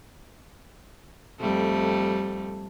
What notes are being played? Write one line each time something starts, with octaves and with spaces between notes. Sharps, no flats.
F2 G3 A3